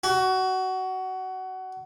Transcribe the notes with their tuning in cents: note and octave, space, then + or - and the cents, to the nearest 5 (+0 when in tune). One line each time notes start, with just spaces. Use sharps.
F#4 +20